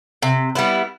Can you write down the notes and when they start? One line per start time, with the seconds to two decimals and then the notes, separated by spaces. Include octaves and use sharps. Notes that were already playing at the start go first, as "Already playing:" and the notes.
0.22 C3
0.55 G3 B3 E4